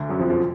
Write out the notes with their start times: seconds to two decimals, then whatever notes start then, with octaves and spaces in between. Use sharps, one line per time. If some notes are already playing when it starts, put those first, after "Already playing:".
Already playing: D2 D3
0.09 F#2 F#3
0.19 F2 F3
0.30 F3